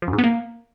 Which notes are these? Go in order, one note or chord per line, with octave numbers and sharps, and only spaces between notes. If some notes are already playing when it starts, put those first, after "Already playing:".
F3
F#2
G#2
B3
A#3